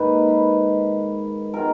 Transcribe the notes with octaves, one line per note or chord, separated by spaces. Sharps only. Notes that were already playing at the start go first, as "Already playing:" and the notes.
Already playing: G#2 D#3 A#3 B4
B4
D#3 G#3 B3 A#4